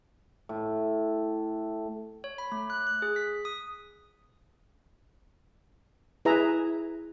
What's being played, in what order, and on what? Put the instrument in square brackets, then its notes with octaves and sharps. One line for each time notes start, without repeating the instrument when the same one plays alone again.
[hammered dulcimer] A2
[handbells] C#5
B5
A3
F#6
F#6
G#4
B6
D#6
[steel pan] E4 G#4 B4 E5 A#5